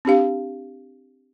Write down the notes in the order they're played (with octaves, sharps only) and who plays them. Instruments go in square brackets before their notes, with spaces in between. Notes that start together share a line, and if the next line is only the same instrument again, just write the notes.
[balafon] C4 D4 G4 F5